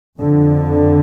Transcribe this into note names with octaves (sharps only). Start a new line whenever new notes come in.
F2 D3